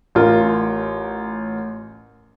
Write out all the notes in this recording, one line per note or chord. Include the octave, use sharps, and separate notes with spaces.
A1 F4 A#4